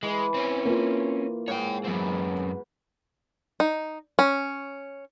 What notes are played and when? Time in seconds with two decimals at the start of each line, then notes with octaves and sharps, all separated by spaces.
0.03 E3 G#3
0.34 C4 C#4
0.65 A#3 F4
1.48 G#2 C#5 G5
1.85 F#2 B2 C4
3.60 D#4
4.19 C#4